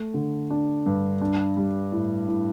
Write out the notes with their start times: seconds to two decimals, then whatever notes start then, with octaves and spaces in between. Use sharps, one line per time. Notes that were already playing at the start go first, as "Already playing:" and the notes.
Already playing: A3
0.14 D3
0.50 D4
0.86 G2
1.22 D4
1.57 G3
1.92 A2
2.28 A2